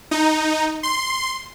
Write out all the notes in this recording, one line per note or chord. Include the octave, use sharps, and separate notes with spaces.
D#4
C6